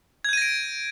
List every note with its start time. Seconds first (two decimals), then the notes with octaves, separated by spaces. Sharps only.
0.24 G#6
0.29 G6
0.33 D#7
0.37 A#6
0.42 D7